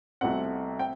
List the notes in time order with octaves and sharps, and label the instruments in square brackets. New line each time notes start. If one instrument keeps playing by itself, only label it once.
[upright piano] C2 B2 A3 C4 F#5
C4 G5